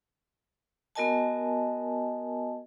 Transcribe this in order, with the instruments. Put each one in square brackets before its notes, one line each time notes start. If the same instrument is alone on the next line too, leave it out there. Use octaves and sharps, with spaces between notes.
[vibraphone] B3 F#4 A#4 D#5 G#5 A5